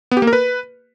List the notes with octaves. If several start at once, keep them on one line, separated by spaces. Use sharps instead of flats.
B3
G4
A#3
A#4
B4